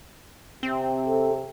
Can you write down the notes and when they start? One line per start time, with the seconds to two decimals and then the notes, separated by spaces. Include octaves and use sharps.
0.63 C3 C4
1.05 A4